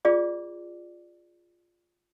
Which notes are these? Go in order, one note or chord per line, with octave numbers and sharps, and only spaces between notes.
F4 G#4 D5 D6